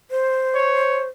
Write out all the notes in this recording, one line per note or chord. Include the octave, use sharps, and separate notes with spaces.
C5
C#5